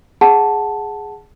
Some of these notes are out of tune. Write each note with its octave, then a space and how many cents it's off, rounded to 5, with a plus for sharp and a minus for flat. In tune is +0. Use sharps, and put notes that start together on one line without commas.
G#4 +0 F#5 +0 A5 +0